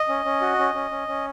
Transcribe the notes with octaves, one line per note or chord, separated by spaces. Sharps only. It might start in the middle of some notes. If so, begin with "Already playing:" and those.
Already playing: D#5
C#4
C#4
F#4
C#4
C#4
C#4
C#4